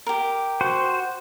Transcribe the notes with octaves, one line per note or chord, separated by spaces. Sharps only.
G4 A#4
F#4 C5